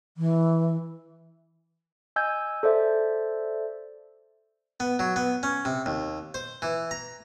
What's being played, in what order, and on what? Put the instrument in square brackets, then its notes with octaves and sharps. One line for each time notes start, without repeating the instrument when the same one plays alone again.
[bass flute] E3
[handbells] D#5 G#5 E6 G6 G#6
A4 C5 D5 E5
[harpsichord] B3
F#3
B3
C#4
C3
D#2
C5
E3
A#5